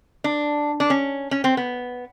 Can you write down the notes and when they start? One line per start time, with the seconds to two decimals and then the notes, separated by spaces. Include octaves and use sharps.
0.24 D4
0.80 D4
0.90 C#4
1.31 C#4
1.44 C4
1.57 B3